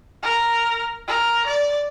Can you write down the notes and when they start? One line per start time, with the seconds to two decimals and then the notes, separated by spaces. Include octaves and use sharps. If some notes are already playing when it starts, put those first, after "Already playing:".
0.23 A#4
1.08 A#4
1.47 D5